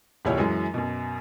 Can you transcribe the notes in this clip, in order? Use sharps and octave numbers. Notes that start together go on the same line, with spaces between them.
E1 C#2 A#2 E4 G4 C#5
F#2 E3 F#3 G#3
F#2 B2